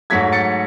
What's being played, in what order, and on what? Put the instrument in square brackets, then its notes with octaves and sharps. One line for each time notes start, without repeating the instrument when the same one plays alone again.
[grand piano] G#2 F#3 A3 G#6 B6
A6 C#7